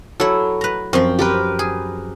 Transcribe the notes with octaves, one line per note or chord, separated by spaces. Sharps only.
F#3 E4 A4
B4 A#5
F#2 F3 C4
G4 A#4 B4
G#4